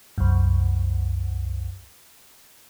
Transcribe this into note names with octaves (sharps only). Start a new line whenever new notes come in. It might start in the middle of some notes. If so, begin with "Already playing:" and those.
C2 F#2